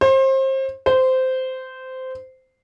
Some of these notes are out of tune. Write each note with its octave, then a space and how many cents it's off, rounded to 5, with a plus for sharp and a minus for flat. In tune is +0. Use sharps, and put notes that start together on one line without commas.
C5 +30
C5 -15